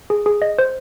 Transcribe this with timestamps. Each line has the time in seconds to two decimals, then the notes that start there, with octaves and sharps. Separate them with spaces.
0.10 G#4
0.26 G#4
0.42 D#5
0.58 C5